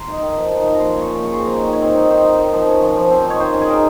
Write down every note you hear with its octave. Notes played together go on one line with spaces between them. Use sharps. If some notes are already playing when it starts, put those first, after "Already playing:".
Already playing: A#5 C6
D#4
D#3
F3
D#4
F3
A#5
A#2 C6
C#4
C#6
A#2
C#3 C#6
C4 C6
A#5
D#4 C#5
D#3 D#5
C#5
C4
D#4
D#3 C5
D#4
D#3
F3
C#4
F3
F3
C4
D#4
C#5
D#3 C5
C#4
G#4
D#3 A#4